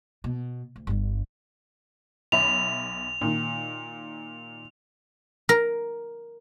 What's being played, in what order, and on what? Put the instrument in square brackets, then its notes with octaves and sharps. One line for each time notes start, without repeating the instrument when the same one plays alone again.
[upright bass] B2
D2
G1 G2
[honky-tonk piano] B1 E5 B5 [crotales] F7
[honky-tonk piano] A#2 D#3
[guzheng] A#4